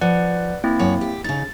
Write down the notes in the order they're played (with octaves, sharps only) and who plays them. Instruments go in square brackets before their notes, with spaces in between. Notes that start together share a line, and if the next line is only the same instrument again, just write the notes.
[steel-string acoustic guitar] F3 [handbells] B4 D5 F#5
[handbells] A#3 C4 E4
[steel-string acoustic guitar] F#2 C#5 F#5
G4
[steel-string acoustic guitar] C#3 D#4 [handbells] A6